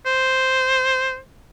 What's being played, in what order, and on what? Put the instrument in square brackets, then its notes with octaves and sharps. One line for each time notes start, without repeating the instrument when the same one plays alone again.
[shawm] C5